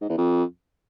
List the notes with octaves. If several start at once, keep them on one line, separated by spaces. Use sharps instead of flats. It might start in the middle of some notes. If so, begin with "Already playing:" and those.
G#2
E2
F2